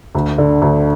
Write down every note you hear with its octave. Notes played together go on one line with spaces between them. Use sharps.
D2
D3
D2